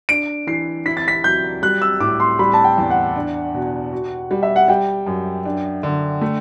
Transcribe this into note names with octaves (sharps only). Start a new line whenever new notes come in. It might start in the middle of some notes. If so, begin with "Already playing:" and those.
D4 D7
E3 C7
E4 B6
A6
B6
F#3 G6
G3 F#6
E6
A2 D6
C6
G3 B5
A5
G5
E2
F#5
D4
B2
F#4
G3
E5
F#5
G3 G5
F#2
D4
D3
A3